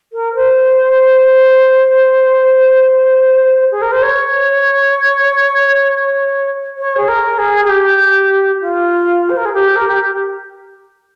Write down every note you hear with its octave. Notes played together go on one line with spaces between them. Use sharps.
A#4
C5
G#4
A#4
C5
C#5
C#5
G#4
A#4
G#4
G#4
G4
F4
C5
A#4
G#4
G4
A#4
G4